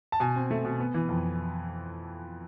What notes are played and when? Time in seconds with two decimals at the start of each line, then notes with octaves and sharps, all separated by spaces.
0.12 A5
0.20 B2 G#5
0.36 C4
0.51 A3
0.65 B2
0.80 B3
0.94 E3
1.09 F2